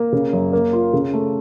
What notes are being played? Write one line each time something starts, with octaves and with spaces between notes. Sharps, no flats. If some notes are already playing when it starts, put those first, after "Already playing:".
Already playing: A#3
C#3
F#2
A#3
F4
C#3
A3